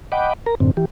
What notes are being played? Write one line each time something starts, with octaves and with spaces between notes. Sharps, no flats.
D#5 F#5 G5 B5 D6
A#4 A#5
F#2 A2 D3 C4
E3 G4